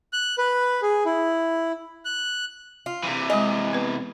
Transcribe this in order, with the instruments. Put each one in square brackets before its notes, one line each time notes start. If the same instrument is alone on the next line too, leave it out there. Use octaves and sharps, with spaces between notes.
[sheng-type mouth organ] F#6
B4
G#4
E4
F#6
[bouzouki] F4
[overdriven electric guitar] C3 E3
[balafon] G#3 G#5 [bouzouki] D#5
[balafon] B3 B4